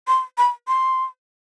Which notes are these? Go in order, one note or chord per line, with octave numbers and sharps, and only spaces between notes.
C6
B5
C6